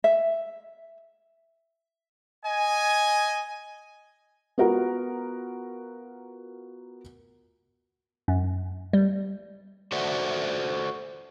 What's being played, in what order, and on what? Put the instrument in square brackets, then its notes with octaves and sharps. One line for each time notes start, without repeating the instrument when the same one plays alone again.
[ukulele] E5
[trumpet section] D#5 G#5
[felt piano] B3 F4 F#4 A#4 F#5
[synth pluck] F#2
G3
[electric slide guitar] F#4 A4 C5 D5 E5 F#5